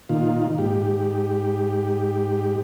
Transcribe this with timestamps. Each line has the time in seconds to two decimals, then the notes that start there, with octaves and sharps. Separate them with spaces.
0.09 A#2 D#3 F4
0.58 G#2 G4